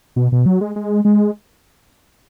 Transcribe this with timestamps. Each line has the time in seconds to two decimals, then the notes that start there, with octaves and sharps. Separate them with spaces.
0.16 B2
0.32 B2
0.46 F#3
0.61 G#3
0.76 G#3
1.05 G#3